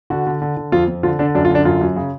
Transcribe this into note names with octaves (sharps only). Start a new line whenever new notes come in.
D3 F#4
D3
D3
D3
F2 F4
F2
D3 F4
D3 D4
F#2 D4
F4
D3
D4
F#2 F4
F#2
C#3